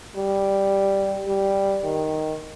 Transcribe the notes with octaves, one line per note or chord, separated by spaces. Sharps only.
G3
G3
D#3